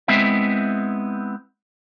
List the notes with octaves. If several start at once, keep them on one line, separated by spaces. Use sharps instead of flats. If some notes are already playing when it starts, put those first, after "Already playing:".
G#3 B3 C4 E4 E5